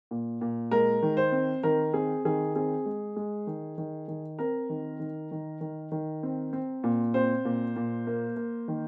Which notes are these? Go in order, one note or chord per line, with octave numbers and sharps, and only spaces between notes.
A#2
A#2
G#3 A#4
D#3
C5
C4
D#3 A#4
C4 G#4
D#3 G#4
C4 G#4
G#3
G#3
D#3
D#3
D#3
C4 A#4
D#3
D#3
D#3
D#3
D#3
C4
C4
A#2
C4 C5
A#2
A#2
A#3
A#3
D#3